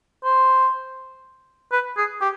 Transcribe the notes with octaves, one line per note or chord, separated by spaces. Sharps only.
C5
B4
G#4
G4